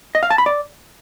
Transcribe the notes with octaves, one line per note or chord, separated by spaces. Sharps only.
D#5
F5
A5
B5
D5